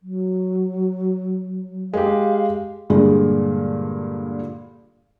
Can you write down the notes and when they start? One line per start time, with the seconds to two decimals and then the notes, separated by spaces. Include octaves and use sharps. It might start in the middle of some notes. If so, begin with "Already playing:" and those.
0.01 F#3
1.93 G#3 G4 F5
2.90 G2 A#2 D3 G#3